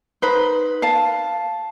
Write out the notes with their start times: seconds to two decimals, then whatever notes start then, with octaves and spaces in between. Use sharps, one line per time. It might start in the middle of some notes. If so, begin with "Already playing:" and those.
0.22 D#4 B4 C5
0.82 F5 A5